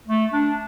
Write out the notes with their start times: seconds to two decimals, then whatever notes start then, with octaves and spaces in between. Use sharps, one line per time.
0.07 A3
0.33 D4